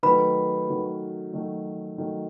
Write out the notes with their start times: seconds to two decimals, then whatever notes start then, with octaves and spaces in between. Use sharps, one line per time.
0.03 D#3 F#3 A3 B4 B5
0.68 D#3 F#3 A3
1.33 D#3 F#3 A3
1.98 D#3 F#3 A3